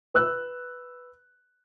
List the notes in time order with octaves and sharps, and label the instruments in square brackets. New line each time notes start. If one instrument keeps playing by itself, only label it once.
[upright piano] B4 E6 F#6